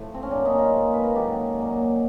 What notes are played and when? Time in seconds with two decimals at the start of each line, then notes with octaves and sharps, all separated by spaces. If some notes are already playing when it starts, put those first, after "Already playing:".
Already playing: A2 F3 A3
0.14 C4
0.23 C#4
0.30 A2 F#3 A#3 C4 D4
0.45 C#4 D#4
0.58 D#4 F4
0.72 G#2 F3 A#3
0.93 B4
1.04 A#4
1.15 G#2 D#3 F#3 A#3 G4 A4
1.57 A#2 F#3 A#3